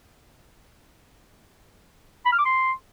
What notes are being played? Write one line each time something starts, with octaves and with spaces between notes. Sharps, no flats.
B5
F6
D6
C6